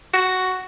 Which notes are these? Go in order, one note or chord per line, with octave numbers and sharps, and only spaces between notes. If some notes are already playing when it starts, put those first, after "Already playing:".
F#4